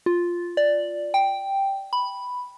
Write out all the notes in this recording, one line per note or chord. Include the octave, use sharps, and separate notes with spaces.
F4
D5
G5
B5